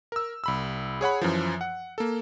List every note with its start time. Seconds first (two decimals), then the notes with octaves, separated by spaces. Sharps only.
0.12 A#4 E6
0.44 C2 B5 E6
1.01 G#4 C#5 F#5 B5
1.21 F#2 E3 F3
1.61 F#5
1.98 A#3 A4